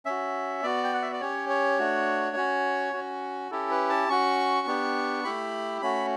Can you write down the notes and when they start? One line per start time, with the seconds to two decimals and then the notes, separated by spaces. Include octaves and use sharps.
0.06 C#4 F#4 E5
0.63 B3 F#4 D5
0.84 G5
0.94 F#5
1.02 E5
1.12 D5
1.21 C#4 G4 C#5
1.49 C#5
1.79 A3 D4 F#4
2.36 C#4 F#4
2.93 C#4 F#4
3.51 C#4 E4 G4 A4
3.71 B4
3.90 A5
4.09 C#4 F#4 C#6
4.67 B3 D4 G4
5.24 A3 E4 G4 B5
5.81 A3 C#4 F#4 B5